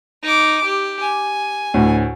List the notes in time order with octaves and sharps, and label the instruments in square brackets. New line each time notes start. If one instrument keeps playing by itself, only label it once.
[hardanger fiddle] D#4 D6
G4
G#5
[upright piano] D2 A2